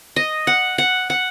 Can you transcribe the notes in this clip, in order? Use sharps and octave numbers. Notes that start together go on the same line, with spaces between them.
D#5
F#5
F#5
F#5